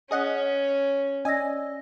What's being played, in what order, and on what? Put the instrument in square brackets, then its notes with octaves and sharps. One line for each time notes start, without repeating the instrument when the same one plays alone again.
[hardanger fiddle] C#4 [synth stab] G#4 D#5 F#5
[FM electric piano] C#4 D#5 [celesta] D5 E6 A#6 [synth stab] G#5